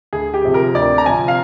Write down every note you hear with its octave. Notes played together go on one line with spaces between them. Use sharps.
D2 G#4
G4
C3 F3 C4
A#4
D2 D5
A#5
C3 F3 C4 G#5
F5